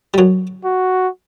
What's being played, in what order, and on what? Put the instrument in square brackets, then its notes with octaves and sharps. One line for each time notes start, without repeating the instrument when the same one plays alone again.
[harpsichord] G3
F#2 F#3
[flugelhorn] F#4